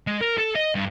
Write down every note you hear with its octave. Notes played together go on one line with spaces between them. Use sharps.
G#3
A#4
A4
D#5
G2